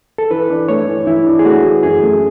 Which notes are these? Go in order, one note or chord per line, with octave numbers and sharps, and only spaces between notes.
A4
E3 B4
D4
A3 C#5
E3
E3 E4
D4
G#4
A3 F#4
E3
F#2 G#4
A3